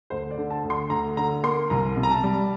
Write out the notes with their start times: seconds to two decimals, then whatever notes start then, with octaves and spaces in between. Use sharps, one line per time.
0.10 D2 C5
0.31 D5
0.37 D3
0.50 A5
0.64 D2
0.70 C6
0.90 D2 A#5
1.17 D3 A#5
1.43 A#3 C6
1.70 C2 A#5
1.96 C3
2.03 A#5
2.11 A5
2.23 G3